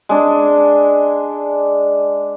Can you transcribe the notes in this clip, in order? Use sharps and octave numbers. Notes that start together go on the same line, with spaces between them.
G#3 D4